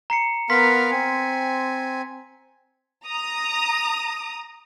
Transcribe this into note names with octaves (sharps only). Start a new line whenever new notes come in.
A#5 C7 C#7
B3 A#4 F5 C6 B6
C4 G#5
A#5 D#6